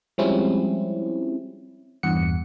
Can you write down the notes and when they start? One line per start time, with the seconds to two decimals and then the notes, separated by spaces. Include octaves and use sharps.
0.18 F3 G3 G#3 C4 C#4 E4
2.03 E2 G2 F#5 C#7